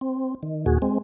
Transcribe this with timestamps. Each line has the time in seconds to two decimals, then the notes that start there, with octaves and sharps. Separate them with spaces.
0.01 C4
0.43 D#3
0.66 D#2 A#2 F#4 G#4
0.82 G#3 C4